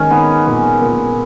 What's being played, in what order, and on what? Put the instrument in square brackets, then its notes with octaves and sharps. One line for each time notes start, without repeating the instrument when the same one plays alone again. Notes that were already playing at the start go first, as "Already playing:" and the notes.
Already playing: [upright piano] D#3 A#3 [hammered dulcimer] G#3 C#4
[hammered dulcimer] B3 [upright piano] D#4
[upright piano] A#2
A#2